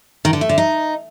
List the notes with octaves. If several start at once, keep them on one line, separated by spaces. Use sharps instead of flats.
D#3
D3
A3
D3
D#4